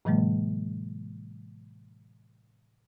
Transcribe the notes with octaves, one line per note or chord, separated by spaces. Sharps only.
A2 C3 E3 F#3 G#3 A#3